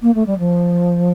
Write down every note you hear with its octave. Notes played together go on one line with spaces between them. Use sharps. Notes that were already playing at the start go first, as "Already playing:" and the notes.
A#3
A3
G3
F3